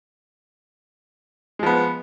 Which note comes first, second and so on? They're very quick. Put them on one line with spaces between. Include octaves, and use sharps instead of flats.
G#3 F3 B3